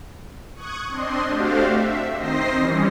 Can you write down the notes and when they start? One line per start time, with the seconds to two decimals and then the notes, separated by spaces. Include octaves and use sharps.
0.55 C#6 D#6 F#6 G#6
0.88 C4 D4 D#5 C6
1.27 A3 D4 F#4 G4 C5 F5
1.65 E5
2.17 D#3 C4 C5 D#5 A#6 C7
2.58 E3 G3 C#4